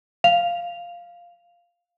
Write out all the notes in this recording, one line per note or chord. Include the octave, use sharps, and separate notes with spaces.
F5 F7